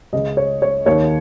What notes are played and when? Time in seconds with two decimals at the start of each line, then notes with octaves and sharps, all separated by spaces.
0.13 C#2 C#3 D#5
0.37 C#5
0.62 C#5
0.86 D#2 D#3 C#5